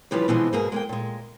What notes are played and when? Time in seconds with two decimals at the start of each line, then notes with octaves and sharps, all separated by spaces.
0.11 C#3 E3 F3 G3 D4 B4
0.28 B2 D3 E3 F3 G#3 C4
0.53 G#2 B2 A#3 G#4
0.72 G#3 A#3 G5
0.89 A#2 G#3